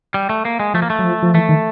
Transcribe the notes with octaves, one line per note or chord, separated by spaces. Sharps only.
G3
A3
A#3
G#3
F3 A3
A#3
A3
F#3
F3
F3
E3 A3
D#3